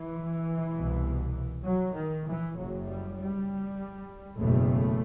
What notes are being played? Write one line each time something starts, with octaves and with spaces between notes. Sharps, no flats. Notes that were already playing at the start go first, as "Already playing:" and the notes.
Already playing: E3
C2 B2
F#3
D#3
E3
F#1 F#2 F#3
G3
G3
F#1 E2 B2 A3